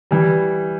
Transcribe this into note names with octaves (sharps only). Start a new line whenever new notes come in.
E3 G3